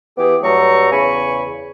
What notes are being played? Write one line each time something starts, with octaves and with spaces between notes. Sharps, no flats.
E3 B3 G4 G#4 D6
G2 F#3 A3 A#5 C#6
E2 C#3 G#5 B5 C#6